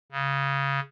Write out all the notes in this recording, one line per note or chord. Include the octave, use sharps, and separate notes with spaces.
C#3